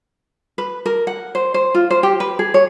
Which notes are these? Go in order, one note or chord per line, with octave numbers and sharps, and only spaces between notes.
B4
A#4
F#5
C5
C5
F4
C5
G4
B4
G#4
C#5